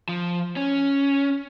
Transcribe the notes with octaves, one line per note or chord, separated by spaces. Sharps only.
F3
C#4